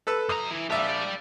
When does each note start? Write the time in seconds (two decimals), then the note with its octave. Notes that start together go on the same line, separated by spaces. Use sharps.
0.07 A4 B4 E6
0.29 F#2 A#5 D#6
0.51 E3
0.70 A#1 G4 D5 E5